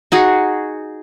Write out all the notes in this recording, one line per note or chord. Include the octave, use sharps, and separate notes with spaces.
D#4 F#4 G#4